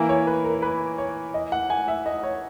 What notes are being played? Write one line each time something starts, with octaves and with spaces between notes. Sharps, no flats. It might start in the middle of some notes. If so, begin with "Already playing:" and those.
Already playing: E3 A#3 E4
C#5
B4
A#4
B4
C#5
D#5
F#5
G#5
E5
D#5
C#5